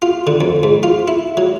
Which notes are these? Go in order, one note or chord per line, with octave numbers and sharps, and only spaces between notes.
F4
D3
F2
G#2
F4
E4
F#3